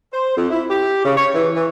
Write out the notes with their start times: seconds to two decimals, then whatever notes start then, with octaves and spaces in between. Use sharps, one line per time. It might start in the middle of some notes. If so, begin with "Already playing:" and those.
0.13 C5
0.36 F2
0.50 E4
0.70 G4
1.05 C#3
1.16 C#5
1.33 E3
1.54 E3